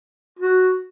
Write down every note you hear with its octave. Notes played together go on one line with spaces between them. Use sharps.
F#4